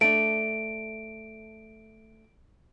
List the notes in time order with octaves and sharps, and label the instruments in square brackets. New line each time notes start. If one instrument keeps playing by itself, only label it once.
[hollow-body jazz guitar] A3 D4 [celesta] D7